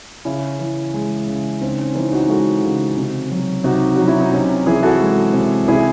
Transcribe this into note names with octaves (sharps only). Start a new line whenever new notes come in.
C#3 C#4 E4
E3
G#3
C#3
C#3 C4 D#4
C#4
E3 C4 D#4
D#4 F#4
G#3 F#4 A4
C#3
C3
F#3
C3 D#4 F#4
F#3 F#4
E4
D#4
C3 C#4
E3 E4 G#4
F#4 A4
G#3
C3
C3 E4 G#4